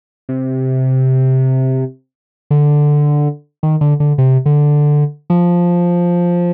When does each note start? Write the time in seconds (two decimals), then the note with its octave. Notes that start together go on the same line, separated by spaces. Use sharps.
0.29 C3
2.51 D3
3.63 D#3
3.81 D3
4.00 D3
4.18 C3
4.46 D3
5.30 F3